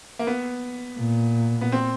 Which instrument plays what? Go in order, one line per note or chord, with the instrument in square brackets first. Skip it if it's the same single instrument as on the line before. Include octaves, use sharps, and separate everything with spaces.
[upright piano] A#3
B3
[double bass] A#2
[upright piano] B3
C4